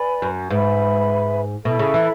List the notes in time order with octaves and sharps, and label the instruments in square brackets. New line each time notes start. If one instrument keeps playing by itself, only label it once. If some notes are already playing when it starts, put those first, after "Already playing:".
Already playing: [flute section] B4 D5 G#5 B5
[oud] F#2
[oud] G#2 [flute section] B4 E5 B5
[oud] B2 [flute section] E4 A4 E5 B5
[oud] C#3
E3